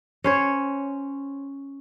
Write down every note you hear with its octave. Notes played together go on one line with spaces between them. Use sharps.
C#4 C5 C#5